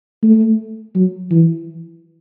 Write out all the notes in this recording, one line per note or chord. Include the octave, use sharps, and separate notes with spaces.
A3
F#3
E3